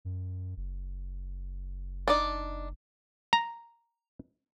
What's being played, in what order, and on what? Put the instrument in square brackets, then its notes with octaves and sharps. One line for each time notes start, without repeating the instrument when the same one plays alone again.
[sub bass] F#2
F#1
[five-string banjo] D4 D#4 D5
[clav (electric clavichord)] A#5